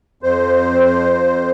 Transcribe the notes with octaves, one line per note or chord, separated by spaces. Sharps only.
F2 C5